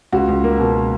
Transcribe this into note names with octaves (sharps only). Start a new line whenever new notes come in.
C#2 F#4
C#2
A#3
B2